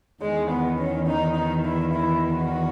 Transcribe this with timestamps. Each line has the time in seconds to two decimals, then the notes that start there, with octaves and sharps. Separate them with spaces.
0.21 E2 D#3 G#3
0.49 B3
0.78 C#4
1.07 D#4
1.34 D#4
1.64 E4
1.92 E4
2.35 F#4